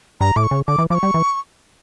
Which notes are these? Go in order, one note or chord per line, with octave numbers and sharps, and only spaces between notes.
G2 A#5
A2 D6
C#6
C#3
D3 D6
E3
F3 D6
C#6
G3
E3